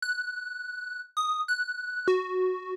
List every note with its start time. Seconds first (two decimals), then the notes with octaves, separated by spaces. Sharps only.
0.02 F#6
1.17 D#6
1.48 F#6
2.08 F#4